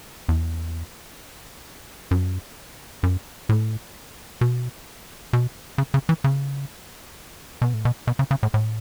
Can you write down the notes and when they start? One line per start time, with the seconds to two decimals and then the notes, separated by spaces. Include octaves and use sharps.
0.29 E2
2.11 F#2
3.03 F#2
3.49 A2
4.41 B2
5.33 B2
5.78 C#3
5.94 C#3
6.09 E3
6.24 C#3
7.62 B2
7.74 A2
7.85 B2
8.07 B2
8.19 C#3
8.31 C#3
8.43 A2
8.54 A2